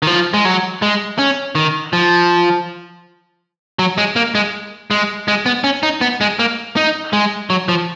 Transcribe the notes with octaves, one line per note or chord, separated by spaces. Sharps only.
D#3
F3
G#3
F#3
G#3
C#4
D#3
F3
F#3
G#3
A#3
G#3
G#3
G#3
B3
C#4
D#4
B3
G#3
A#3
D#4
G#3
F#3
F3